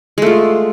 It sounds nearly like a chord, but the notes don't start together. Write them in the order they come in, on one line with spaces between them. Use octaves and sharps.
G#3 A3 F4